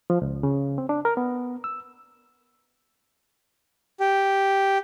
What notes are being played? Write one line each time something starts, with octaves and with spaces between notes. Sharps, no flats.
F3
C#2
C#3
C4
D4
A#4
B3
E6
G4